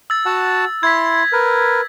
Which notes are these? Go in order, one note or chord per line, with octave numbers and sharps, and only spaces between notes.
E6 A6
F#4 F#5 A5
E4 C6 G#6 B6
A#4 B4